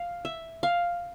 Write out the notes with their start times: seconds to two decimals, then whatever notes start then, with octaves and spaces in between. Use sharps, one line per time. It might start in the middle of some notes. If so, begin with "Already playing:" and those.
Already playing: F5
0.25 E5
0.63 F5